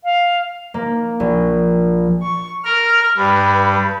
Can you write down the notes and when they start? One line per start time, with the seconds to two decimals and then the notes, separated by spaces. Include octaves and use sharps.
0.04 F5
0.74 A#3
1.20 A#1
2.22 C#6
2.65 A#4 F6
3.17 G2 B4